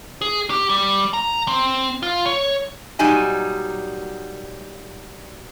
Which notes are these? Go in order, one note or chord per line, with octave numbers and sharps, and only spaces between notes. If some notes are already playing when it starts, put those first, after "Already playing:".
G#4
G4
G3
A#5
C4
F4
C#5
A#2 F#3 G3 D#4 G#5